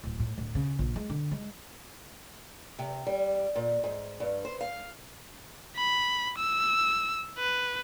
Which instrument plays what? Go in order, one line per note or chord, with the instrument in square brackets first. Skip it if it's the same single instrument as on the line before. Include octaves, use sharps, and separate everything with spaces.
[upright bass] D1
A2
D1
C#3
A#1
G#3
D3
G#3
[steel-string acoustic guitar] C3
G3
A#2
G#2
G2
C5
F5
[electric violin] B5
E6
B4